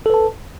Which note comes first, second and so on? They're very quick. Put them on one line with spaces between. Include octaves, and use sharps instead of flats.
A4 B4 A5